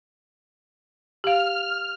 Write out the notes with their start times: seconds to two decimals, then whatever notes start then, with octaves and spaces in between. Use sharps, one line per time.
1.24 G4 F5 F6